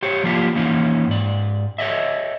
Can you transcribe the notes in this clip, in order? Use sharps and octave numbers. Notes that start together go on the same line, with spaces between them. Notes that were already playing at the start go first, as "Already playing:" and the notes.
G4 C5 C#5
F3 A#3 D4 F4 G4
E3 A#3 C#4 D#4
G#2 D5
A4 C#5 D#5 E5